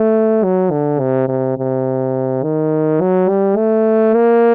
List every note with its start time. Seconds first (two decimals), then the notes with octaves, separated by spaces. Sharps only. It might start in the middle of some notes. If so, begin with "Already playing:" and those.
Already playing: A3
0.44 F#3
0.71 D3
1.00 C3
1.28 C3
1.57 C3
2.43 D#3
3.01 F#3
3.29 G3
3.57 A3
4.14 A#3